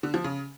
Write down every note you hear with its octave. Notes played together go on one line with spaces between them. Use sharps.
D3
F3
C#3